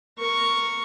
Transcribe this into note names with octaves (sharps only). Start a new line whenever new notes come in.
A#4 C#6